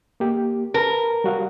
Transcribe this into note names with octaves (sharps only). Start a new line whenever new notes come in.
A#3 G4
A#4 B4 A5 B5
G3 F#4 F5